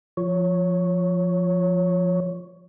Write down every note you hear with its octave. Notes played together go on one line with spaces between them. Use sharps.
F3 C#5